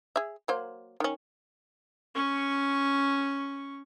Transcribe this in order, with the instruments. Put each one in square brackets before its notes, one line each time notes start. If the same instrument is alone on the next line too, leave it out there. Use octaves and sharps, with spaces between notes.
[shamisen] G#4 E5
F#3 A#3 C5
D#3 C#4
[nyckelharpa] C#4 C#6